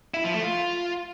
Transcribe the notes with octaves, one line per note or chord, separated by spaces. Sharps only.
E4
F3
A3
F4